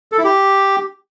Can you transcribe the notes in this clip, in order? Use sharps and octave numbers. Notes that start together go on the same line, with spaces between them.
A4
E4
G4